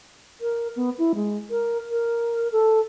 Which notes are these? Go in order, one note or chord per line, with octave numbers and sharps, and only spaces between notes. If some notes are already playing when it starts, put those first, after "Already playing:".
A#4
B3
E4
G#3
A#4
A#4
A4